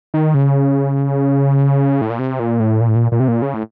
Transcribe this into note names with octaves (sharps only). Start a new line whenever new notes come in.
D#3
C#3
A2
A#2
C3
A#2
A2
A#2
A2
A#2
A#2
C3
A#2
C#3
A2